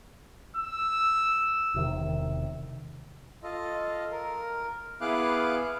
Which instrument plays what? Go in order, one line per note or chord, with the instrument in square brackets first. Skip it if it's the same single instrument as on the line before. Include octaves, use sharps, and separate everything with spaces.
[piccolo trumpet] E6
[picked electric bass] E1 C3 D#3
[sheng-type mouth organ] F4 A4 D#5
A#4
B3 E4 G#4 F5 D6 F#6